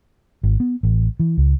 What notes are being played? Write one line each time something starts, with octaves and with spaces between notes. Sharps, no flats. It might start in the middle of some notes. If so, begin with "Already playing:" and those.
G#1
B3
A1
E3
C#2